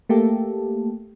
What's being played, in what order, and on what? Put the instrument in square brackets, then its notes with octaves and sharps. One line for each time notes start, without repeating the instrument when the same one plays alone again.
[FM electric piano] A3 A#3 G4 A4